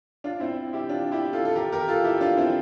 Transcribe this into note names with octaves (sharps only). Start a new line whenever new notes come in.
D4 F4
C4 E4
E4 G4
D4 F4
E4 G4
F4 A4
A4
G4 A#4
G4 A#4
F4 A4
E4 G4
D4 F4
C4 E4